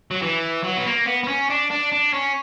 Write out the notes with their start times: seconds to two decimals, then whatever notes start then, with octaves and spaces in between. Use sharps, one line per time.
0.11 F#3
0.22 E3
0.64 F#3
0.78 B3
0.86 A#3
1.06 B3
1.24 B3
1.28 C#4
1.50 D4
1.71 D4
1.92 D4
2.13 C#4